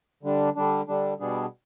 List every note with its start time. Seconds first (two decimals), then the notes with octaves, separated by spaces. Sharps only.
0.23 D3 G3 D4
0.56 D3 G3 D4
0.88 D3 G3 D4
1.20 B2 G3 B3 D4 G#4